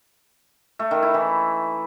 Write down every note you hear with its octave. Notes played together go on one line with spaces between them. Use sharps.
A3
D#3
E4
E3